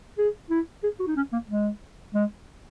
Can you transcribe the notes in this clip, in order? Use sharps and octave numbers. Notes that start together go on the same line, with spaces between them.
G#4
E4
G#4
F#4
D#4
C#4
A#3
G#3
G#3